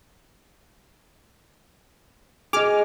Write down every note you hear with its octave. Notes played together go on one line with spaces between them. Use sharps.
G#4 D#5 D6 F6